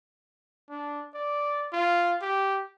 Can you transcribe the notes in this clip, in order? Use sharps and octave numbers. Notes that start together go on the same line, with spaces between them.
D4
D5
F4
G4